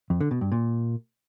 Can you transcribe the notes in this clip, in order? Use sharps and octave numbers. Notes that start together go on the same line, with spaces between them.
F2
D3
B2
G2
A#2